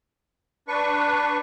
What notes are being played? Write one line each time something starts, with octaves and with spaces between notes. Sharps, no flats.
D4 B4 C#6